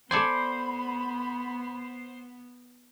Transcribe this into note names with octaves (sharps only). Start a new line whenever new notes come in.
B3 A4 C5 D5 G#5 B5